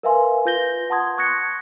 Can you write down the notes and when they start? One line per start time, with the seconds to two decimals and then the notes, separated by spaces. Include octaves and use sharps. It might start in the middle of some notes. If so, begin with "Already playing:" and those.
0.03 A#4 B4 E5 F5 G#5 C6
0.45 F4 B4 G6 A#6 G7
0.90 F#5 A5 C6 D#6 G#6
1.18 C#6 D#6 F#6 G#6 A#6 C#7